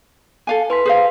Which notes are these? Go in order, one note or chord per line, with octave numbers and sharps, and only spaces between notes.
A4 F5 G#5
E4 B4 C6 B6
G#4 C5 F5